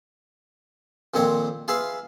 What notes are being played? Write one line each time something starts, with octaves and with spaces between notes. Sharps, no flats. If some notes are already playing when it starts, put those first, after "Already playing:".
F2 A#2 D#3 C4 C#5
F4 G#4 B4 E5 F5